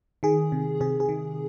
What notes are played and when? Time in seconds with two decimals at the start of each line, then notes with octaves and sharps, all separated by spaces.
0.23 D#3 G#4
0.52 C3
0.80 C3 G#4
1.00 G#4
1.09 D#3